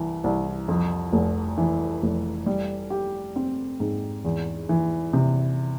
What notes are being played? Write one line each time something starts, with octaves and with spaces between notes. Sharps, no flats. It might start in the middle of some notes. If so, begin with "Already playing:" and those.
Already playing: C2 E3
C2
F2
F1
E3
F1
G3
G4
C4
G#2
E2
E3
C3